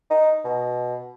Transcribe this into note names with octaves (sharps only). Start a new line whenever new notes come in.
D#4
B2